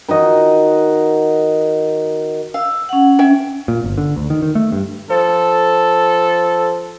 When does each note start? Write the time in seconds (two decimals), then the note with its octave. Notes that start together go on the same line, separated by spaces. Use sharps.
0.08 D#3 F#4 D#5
2.54 F5 E6
2.89 C#4 F#5
3.19 C#4 E5 G5
3.68 A#2
3.84 G1
3.98 D3
4.16 D2
4.30 D#3
4.42 D#3
4.55 A3
4.72 G2
5.10 F3 A4